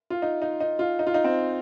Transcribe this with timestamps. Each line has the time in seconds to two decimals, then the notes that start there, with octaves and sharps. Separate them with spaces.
0.10 F4
0.22 D#4
0.42 D#4
0.60 D#4
0.79 F4
0.99 D#4
1.07 F4
1.14 D#4
1.24 C4